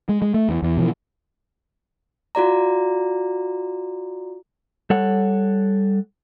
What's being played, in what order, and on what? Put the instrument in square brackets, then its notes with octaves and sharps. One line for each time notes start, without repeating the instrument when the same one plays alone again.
[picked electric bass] G#3
G#3
A3
E2
E2
B2 E3 F3
[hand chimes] F4 F#4 D5 A#5
[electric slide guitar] G3 A4 C#5 F#5